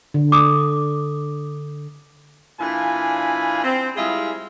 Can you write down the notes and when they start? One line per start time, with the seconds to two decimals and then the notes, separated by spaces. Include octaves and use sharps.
0.14 D3
0.32 D6 D#6
2.60 A#2 E3 D4 F5 G#5 B5
3.63 C4
3.96 G3 G#3 E4 F4 G#4